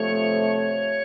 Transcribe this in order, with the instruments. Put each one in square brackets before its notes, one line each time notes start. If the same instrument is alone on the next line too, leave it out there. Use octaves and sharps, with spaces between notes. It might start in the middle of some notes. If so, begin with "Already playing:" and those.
Already playing: [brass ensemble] C3 F3 A3 [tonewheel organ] C#5